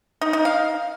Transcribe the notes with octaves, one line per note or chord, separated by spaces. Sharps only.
D#4
D#4
F5